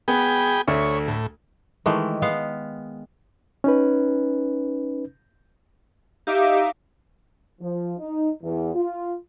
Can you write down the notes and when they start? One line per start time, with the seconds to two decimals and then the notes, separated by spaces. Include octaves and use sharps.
0.08 B3 G#4 G5 B5
0.67 D2 A3 C#5 E5
1.08 A2
1.86 D#3 E3 G#3 A3
2.22 G#3 B3 F5
3.64 C#4 D#4 B4
6.27 D#4 G4 E5 F5 D6
7.61 F3
7.99 D#4
8.43 E2
8.75 F4